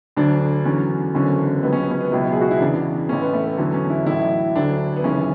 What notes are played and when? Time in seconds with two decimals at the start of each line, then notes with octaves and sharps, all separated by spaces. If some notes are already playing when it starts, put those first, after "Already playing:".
0.16 D2 D3 F#3 D4
0.65 E2 D3 F#3 C#4
1.14 F#1 E2 D3 F#3 C#4
1.63 C#2 C#3 F#3 B3
1.73 C#4
1.82 B3
1.91 C#4
2.01 B3
2.12 C#2 B2 F#3 E4
2.32 G#4
2.41 F#4
2.51 E4
2.60 E2 C#3 E3 D4
3.09 A1 A2 E3 C#4
3.22 B3
3.33 A3
3.46 B3
3.58 E2 D3 F#3
3.74 C#4
3.90 E4
4.06 A1 A2 F#3 E4
4.56 D2 D3 F#3 D4
4.96 B3
5.04 G#1 F#2 C#3 E3 C#4